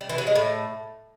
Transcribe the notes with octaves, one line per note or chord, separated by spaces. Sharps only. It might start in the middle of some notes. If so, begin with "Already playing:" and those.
G3
E3
F#3
G#3
A2